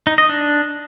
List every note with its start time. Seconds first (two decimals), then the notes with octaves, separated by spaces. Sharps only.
0.07 D#4
0.18 D#5
0.29 D4